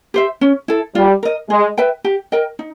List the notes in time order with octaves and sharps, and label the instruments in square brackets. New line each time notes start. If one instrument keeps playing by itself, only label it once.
[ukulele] G4 C5 E5
C#4
E4 A4
[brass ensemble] G3 [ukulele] F4
[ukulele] A#4 D#5
[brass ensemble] G#3 [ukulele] G#4
[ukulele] B4 E5 G5
G4
A#4 D#5 G5
D#4